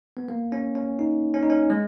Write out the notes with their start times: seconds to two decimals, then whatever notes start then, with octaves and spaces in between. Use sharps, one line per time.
0.17 B3
0.29 A#3
0.52 C#4
0.75 C#4
0.99 D#4
1.34 C#4
1.43 D#4
1.50 C#4
1.70 G#3